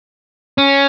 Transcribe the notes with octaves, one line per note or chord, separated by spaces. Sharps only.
C#4